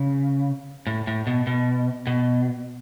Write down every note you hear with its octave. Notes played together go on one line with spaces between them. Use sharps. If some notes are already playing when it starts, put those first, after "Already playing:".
Already playing: C#3
A2
A2
B2
B2
B2